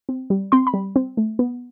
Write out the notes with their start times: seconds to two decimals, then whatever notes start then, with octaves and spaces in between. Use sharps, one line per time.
0.09 C4
0.30 G3
0.52 C4 C6
0.67 B5
0.74 G3
0.96 C4
1.17 A3
1.39 B3